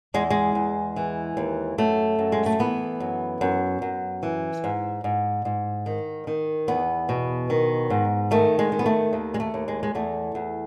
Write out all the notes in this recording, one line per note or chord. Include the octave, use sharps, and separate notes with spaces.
E2 G#3
G#3
E2
E3
D#2
F#2 A3
F#2
G#3
A3
E3 B3
F#2
F#2
F#2
E3
G#2
G#2
G#2
D#3
D#3
E2 B3
B2
D#3
G#2
D#3 A3
G#3
D#3
B3
A3
D#2
G#3
A3
D#2
G#3
G#3
E2 A3
E2